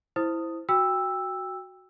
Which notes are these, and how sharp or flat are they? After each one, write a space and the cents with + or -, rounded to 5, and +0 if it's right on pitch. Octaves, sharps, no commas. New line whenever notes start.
E4 +0 C5 -5 D#6 +0
F#4 +0 G5 +25 E6 +0